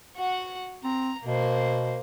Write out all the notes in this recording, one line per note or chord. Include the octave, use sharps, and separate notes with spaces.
F#4 F#5
C4 A#5
B2 A#3 C5